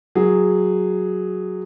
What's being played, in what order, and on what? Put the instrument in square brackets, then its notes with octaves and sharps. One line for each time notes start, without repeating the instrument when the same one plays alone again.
[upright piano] F#3 G#4